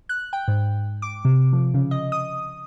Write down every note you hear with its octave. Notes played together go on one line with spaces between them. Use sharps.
F#6
G5
G#2
D6
C3
F3
C#3
D#5
D#6